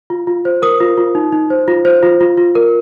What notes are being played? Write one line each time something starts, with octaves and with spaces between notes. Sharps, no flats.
F4
F4
C5
A#4 D#6
F4
F4
D#4
D#4
C5
F4
C5
F4
F4
F4
A#4